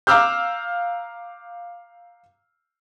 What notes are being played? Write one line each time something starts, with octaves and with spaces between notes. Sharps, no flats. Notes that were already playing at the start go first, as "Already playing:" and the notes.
F5 A#5 D6 E6 F6 G6